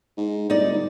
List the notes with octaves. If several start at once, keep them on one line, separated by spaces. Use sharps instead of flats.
G#2
G1 D#4 D5